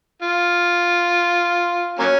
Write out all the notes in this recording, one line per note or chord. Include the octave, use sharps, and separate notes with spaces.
F4
F#3 A#3 C#4